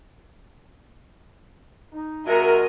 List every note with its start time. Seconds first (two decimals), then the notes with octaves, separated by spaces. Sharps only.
1.93 D#4
2.26 C3 G#3 F#4 A#4 D#5 E5